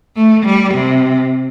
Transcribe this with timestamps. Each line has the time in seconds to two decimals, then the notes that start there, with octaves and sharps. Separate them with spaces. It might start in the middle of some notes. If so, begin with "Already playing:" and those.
0.16 A3
0.46 G3
0.75 C3